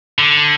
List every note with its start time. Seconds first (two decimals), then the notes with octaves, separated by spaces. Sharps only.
0.19 D3